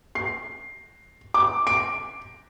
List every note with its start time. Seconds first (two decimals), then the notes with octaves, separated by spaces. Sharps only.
0.15 C7
1.34 D6
1.67 D7